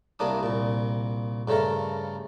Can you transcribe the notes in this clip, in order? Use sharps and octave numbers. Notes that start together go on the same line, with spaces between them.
C2 C3 A#3 D4 D#6
C2 A#2
G2 C#3 A3 A4 A#4